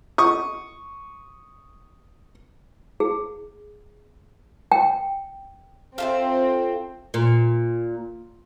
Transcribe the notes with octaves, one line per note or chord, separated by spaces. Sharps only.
C#6 D#6
G#4
G5
C4 F4 A4 E5
A#2